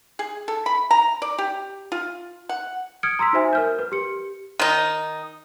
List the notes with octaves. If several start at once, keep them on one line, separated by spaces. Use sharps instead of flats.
G#4
A4
B5
A#5
D5
G4
F4
F#5
D#6 F6 G#6 C#7 D7
A#5 C6 E6 B6
D#4 F#4 C5 E5 G#5
A#4 F6 G6
B4
G4 C#7
D#3 D#4